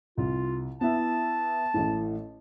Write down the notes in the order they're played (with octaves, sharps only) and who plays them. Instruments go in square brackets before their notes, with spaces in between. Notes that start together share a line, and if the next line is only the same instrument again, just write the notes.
[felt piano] C2 [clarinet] F4
[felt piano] B3 E4 E5 [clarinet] A5
[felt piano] A1 A2